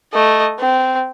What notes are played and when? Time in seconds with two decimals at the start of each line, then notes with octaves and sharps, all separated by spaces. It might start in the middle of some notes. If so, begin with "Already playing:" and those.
0.13 A3 D#5
0.60 C4